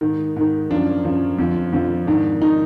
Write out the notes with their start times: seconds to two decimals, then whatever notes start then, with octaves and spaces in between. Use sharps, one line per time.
0.01 G#2 D#3
0.36 G#2 D#3
0.71 F#2 F3 D4
1.04 F#2 F3
1.38 F2 D3 F3
1.73 F2 D3 F3
2.07 G#2 D#3 D4
2.42 D#3 D#4